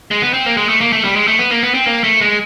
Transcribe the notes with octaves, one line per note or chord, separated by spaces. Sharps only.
G#3
B3
C4
A#3
G#3
A3
A#3
A3
G3
G#3
A3
B3
A#3
B3
C4
A#3
A3
G#3